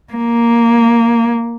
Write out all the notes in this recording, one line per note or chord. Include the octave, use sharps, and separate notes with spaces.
A#3